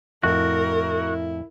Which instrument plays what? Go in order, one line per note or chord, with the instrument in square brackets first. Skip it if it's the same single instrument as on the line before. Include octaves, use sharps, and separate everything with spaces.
[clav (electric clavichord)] F2 A2 [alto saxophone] E4 [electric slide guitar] F#4 [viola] A#4